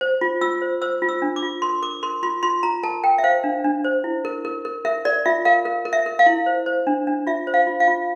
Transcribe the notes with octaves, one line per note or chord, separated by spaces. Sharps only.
C5
F4
F4 E6
C5
C5 E6
F4
E6
D4
D6
F4
A#4 C6
A#4 D6
A#4 C6
F4 C6
F4 C6
F4 A#5
A#4 A5
A#4 G5
E5
C5 F5
D4
D4
C5
E4
A#4
A#4
A#4
A#4 E5
A#4 D5
F4 E5
A#4 F5
A#4
A#4
E5
A#4
F5
E4
C5
C5
D4
D4
F4 E5
C5
F5
F4
F5
F4